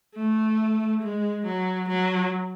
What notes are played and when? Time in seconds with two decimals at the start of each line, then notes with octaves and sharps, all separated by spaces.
0.15 A3
1.02 G#3
1.45 F#3
1.88 F#3